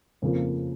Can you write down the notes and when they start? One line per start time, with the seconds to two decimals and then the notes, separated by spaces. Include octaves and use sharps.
0.22 F2 C#3 F3 A#3